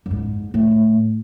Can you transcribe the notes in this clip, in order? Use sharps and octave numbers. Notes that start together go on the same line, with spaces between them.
F#2
G#2
A2